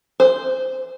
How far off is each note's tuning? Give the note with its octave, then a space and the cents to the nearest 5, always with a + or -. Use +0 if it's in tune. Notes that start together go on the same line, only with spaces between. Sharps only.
C5 -10